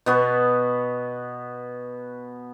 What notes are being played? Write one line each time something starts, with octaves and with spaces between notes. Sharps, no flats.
B2 B3 F#4